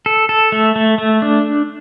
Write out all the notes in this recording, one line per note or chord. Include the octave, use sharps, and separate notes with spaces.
A4
A4
A3
A3
A3
D4